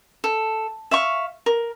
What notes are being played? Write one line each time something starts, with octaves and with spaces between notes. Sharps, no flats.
A4
E5 F5 C#6
A#4